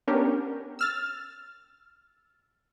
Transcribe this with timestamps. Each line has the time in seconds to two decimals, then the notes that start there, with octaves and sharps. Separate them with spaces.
0.07 B3 C#4 D4 G4 A#4
0.79 E6 F6 A6